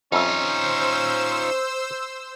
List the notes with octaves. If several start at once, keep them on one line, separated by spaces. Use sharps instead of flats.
F2 C#4 D#4 F4 C5 E5 E6